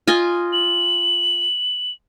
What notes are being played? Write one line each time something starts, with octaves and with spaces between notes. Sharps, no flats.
F4 D#5 G#5
F#7